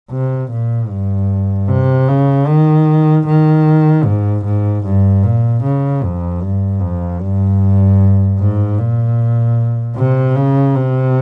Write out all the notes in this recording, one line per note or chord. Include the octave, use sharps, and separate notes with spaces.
C3
A#2
G2
C3
C#3
D#3
D#3
G#2
G#2
G2
A#2
C#3
F2
G2
F2
G2
G#2
A#2
C3
C#3
C3